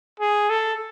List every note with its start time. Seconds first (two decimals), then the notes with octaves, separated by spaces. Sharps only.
0.20 G#4
0.50 A4